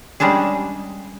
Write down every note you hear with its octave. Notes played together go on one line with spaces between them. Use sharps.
G3 G#3 C#4 D4 G#4